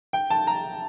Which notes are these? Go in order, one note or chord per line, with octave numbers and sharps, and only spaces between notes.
G5
A5
A#5